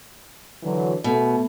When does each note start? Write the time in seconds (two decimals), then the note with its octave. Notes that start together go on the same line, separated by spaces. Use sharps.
0.63 D3 E3 F#3
1.04 B2 A3